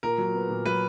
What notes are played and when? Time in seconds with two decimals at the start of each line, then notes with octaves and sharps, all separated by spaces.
0.03 A#2 A#4
0.18 F#3
0.35 B3
0.50 A#2
0.65 F#3 B4